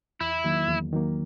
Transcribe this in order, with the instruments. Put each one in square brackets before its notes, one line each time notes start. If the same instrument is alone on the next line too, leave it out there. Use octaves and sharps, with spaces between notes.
[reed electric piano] E2 [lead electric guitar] E4
[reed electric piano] D#3 F#3 A#3
E2
D#3 F#3 A#3